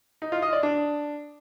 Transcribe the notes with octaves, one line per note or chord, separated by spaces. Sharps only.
D#4
F4
D#5
D5
D4